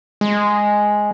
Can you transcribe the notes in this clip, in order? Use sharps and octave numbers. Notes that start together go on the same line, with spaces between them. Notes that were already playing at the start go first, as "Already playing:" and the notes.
G#3